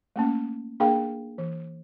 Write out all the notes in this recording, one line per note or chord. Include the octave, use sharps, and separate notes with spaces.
A3 A#3 C#4
A#3 D4 G#4 A#4 F5 G5
E3